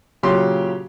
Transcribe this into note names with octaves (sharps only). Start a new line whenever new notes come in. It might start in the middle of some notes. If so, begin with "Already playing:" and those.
A#2 C#3 F#3 G4 C6